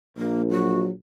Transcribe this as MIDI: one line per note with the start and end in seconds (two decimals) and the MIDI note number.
0.17 0.89 34
0.17 0.42 58
0.51 0.92 54
0.51 0.81 66